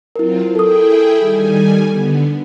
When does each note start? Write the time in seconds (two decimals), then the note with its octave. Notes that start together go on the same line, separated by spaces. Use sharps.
0.16 F#3 C4 E4 F4 A#4
0.55 E4 G#4 A4 G5 D#6
1.18 D#3 G3 G#5
1.90 D3 B3